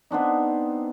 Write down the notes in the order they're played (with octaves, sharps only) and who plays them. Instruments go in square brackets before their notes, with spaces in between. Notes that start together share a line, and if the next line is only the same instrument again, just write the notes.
[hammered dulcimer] B3 C4 D4 D#4